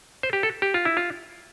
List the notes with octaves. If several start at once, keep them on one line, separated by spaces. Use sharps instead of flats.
C5
G4
A4
G4
F4
E4
F4